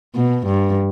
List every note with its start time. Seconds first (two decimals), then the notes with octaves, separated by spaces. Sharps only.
0.15 B2
0.46 G2